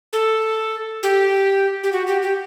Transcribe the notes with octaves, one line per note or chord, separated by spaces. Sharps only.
A4
G4
G4
F#4
G4
G4